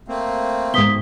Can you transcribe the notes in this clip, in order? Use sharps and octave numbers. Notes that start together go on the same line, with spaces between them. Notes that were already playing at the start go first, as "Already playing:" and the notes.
A3 A#3 C4
G#2 B2 D#6 B6 G7